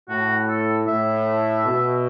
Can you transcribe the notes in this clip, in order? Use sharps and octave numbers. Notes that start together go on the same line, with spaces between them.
A2 F#4
A4
A2 E5
B2